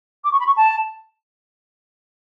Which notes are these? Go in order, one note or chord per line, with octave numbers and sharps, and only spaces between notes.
D6
C#6
B5
C#6
A5